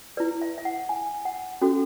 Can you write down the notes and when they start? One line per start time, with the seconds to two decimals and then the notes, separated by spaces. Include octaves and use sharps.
0.17 E4 B4 D5
0.42 E5
0.58 E5
0.65 F#5
0.89 G#5
1.25 F#5
1.61 C#4 F#4 A4